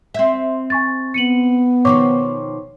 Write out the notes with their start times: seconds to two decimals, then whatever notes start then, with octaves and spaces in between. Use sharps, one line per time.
0.14 C4 E5
0.70 G#5 C#6 A6
1.14 B3 C#7 D#7 F#7
1.85 B2 D#3 F3 C#5 C#6 D6